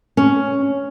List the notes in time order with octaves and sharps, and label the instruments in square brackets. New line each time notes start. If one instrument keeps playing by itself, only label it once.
[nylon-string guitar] C#4